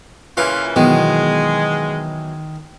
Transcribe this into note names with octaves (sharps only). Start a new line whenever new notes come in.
A#2 C#3 E3 F4
B2 D#3 E3 F#3 G#3 B3